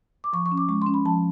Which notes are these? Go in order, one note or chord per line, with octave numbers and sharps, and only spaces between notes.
D6
F3 C#6
C#6
C#4
D6
G#3 C#6
C6
C#4
B5
F3 A5